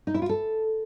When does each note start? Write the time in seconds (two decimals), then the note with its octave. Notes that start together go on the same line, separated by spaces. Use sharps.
0.07 D#4
0.14 E4
0.22 F4
0.29 A4